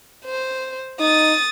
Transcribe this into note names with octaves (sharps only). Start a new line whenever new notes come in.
C5
D#4 D#6 A6